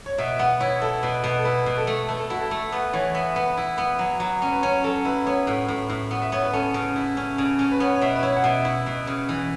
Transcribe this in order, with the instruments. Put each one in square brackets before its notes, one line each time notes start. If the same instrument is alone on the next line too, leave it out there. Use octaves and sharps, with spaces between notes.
[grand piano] C#5
[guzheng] B2 [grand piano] E5
[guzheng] B3 [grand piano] F#5
[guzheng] E4 [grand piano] C#5
[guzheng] E4 [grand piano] A4
[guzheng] B2 [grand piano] B4
[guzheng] B2 [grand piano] B4
[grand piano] A4
[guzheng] E4 [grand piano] B4
[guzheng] B2
[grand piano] A4
[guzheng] A3
[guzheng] A3 [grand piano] B4
[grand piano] A4
[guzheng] E4 [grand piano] F#4
[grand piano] A4
[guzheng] A3
[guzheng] B3 [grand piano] B4
[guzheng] E3 [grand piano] C#5
[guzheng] B3 [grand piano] E5
[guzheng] B3 [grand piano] B4
[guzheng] E4
B3
F#3
F#3
C#4
[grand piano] B4
[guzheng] C#4 [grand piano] C#5
[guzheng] F#3 [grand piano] A4
[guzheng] E4 [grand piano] B4
[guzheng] B3 [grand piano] C#5
[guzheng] A2
A2
A2
B3
[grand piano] E5
[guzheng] B3 [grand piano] C#5
[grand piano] B4
[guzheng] C#4 [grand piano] A4
[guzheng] C#3
E4
C#4
C#3
C#4
[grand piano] B4
[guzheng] B3 [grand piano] C#5
[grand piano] C#5
[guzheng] B2 [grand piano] E5
[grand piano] B4
[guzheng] E4 [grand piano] C#5
[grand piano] F#5
[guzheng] B2 [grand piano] E5
[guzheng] E4
B2
C#3
E3